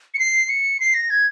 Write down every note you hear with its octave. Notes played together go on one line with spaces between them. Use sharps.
C#7
C7
C#7
C7
A#6
G#6